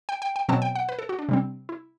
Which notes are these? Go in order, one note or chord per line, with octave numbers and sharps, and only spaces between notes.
G5
G5
G5
B2 F#3 C4 A5
G5
F#5
B4
A4
F#4
D4
C3 G3 C4
E4